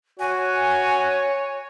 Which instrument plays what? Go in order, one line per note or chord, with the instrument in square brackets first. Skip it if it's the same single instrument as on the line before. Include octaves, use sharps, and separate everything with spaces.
[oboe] F#4 [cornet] C#5 [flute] G#5